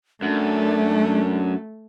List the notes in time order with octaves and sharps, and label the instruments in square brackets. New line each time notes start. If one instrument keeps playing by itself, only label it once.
[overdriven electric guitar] F#2 [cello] A3 [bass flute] D4